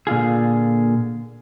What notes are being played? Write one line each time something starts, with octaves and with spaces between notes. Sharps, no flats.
A#2 D3 F4 G#4